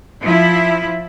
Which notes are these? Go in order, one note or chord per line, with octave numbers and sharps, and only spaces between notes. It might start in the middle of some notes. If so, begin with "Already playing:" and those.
F3 E4